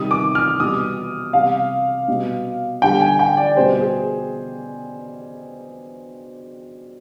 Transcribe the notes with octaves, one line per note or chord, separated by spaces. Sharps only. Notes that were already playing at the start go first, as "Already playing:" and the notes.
Already playing: C3 D#3 G3 D#6
D6
F6
B2 G3 D#6
C3 G3 F5
B2 G3
D3 G3 G5
G#5
G5
D5
B2 G3 C5
G#4